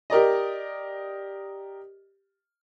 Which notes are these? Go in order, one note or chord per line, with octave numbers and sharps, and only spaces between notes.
G4 A#4 D5 D#5